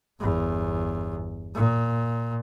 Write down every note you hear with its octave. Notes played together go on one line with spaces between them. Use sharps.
G1 E2
A#2